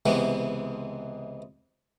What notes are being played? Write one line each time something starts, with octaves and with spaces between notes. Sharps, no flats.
C#2 C3 E3 G#3 B3